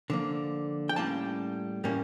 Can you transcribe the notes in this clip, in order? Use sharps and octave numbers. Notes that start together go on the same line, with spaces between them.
D3 F3 A#3
G5
A2 G3 A#3 C#4 F5 A5
A2 G3 A#3 C#4